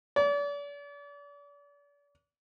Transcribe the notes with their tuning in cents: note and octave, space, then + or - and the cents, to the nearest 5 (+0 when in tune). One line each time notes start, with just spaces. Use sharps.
D5 -40